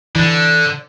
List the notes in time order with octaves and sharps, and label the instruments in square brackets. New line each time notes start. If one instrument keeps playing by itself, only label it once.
[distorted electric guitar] D3 [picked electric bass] E3